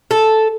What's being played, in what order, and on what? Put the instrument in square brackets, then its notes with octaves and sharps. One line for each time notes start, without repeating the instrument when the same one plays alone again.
[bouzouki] A4